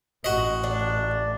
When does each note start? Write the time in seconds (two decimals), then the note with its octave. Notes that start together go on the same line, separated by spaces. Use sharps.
0.24 A1 F#4 D#5
0.64 D4